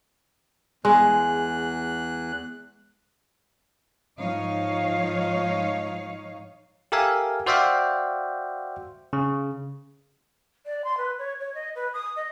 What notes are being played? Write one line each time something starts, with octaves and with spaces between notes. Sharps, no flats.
E2 G#3 F#6
G#2 F3 D#4 C#5 F5
G4 A4 A#4 E5 F5 G#5
F#4 C5 D5 E5 F5 G5
C#3
D5
C6
B4
C#5
C#5
D#5
B4
D#6
D#5